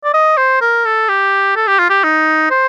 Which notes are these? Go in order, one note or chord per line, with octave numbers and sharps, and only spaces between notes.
D5
D#5
C5
A#4
A4
G4
A4
G4
F4
G4
D#4
C5